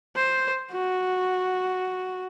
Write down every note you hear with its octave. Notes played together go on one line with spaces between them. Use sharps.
C5
F#4